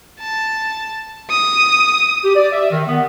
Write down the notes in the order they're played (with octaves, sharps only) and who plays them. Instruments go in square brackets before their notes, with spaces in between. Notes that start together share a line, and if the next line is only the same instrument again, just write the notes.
[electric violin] A5
D#6
[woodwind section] G4
D5
E5
D#3
B3